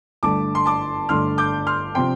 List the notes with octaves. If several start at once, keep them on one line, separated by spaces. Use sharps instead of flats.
G1 G2 D3 A3 A5 D6
C6
A5 D6
G1 G2 D3 A3 C6 F6
D6 G6
C6 F6
C3 F3 C4 G5 C6